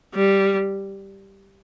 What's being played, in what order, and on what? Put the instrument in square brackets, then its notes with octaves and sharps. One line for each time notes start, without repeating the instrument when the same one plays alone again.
[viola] G3